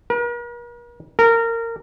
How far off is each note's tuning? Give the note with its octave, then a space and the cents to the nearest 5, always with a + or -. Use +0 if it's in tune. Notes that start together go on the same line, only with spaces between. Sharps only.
A#4 +45
A#4 -20